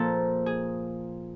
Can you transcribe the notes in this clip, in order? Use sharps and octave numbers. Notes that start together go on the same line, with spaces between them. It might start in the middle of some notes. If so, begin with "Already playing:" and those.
Already playing: A#2 F3 A#3 A4
G#4